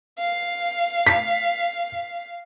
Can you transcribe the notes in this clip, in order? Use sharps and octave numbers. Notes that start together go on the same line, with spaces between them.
F5
B6